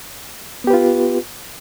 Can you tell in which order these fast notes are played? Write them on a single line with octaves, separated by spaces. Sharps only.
B3 G4 B4 F4